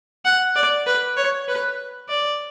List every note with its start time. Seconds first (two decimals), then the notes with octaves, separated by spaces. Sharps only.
0.25 F#5
0.56 D5
0.86 B4
1.17 C#5
1.48 B4
2.09 D5